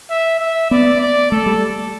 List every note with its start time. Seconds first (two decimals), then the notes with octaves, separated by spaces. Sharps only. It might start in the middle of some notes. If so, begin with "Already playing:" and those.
0.10 E5
0.40 E5
0.71 B3 D5
1.01 D5
1.32 A3 A4
1.46 G3